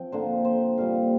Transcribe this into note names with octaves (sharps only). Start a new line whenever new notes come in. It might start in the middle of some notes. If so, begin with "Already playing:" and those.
Already playing: F3 C4 G5
D3 A#3 C5
C5
A#2 G3 A#3 F5
G5